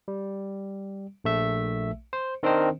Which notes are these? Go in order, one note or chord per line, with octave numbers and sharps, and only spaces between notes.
G3
A#1 A3 E5
C5
D#3 C4 D4 A#4 C5 D#5